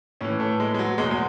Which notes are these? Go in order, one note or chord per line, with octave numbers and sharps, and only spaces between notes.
A2 E3 C#4
A3
G#3
G#3
F#3
E2 B2 G#3
G#3